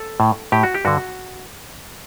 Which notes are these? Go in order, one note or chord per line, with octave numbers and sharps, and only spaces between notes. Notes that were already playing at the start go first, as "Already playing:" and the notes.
Already playing: A4
A2
A2 G4
F#4
G4
G2 D3 F#4